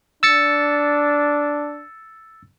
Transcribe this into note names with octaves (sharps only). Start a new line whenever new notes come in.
D4 E6 A6 C#7